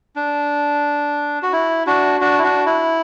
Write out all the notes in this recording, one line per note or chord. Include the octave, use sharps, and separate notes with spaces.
D4
F#4
E4
D4 F#4
D4 F#4
E4
D4 F#4
E4